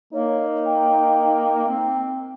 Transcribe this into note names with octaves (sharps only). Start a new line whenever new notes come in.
A#3 D#4 C#5
G5
C4